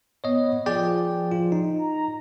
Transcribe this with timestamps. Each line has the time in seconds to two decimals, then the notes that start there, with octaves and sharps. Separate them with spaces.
0.24 B3 C#5 D#5
0.66 F3 G#4 D5 G5
1.31 F4
1.52 D#4
1.78 A#5